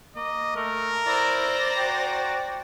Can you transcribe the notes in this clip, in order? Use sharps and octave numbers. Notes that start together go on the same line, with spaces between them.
A#3 D#5
A3 A#4
E4 C5 D5 A#5
F#4 G5